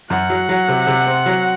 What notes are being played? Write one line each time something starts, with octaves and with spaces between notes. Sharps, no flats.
F#2 F#5
F#3
F#3
C3
C3
C4
F#3